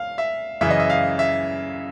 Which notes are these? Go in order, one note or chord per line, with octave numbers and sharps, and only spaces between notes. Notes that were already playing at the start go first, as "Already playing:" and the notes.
Already playing: F5
E5
F#2 C#3 E3 E5
D#5
E5
F5
E5